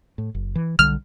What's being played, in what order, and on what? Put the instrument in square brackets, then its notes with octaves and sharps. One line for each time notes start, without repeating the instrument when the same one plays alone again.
[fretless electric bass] A2
F#1
E3
[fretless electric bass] B1 D3 G3 [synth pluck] F6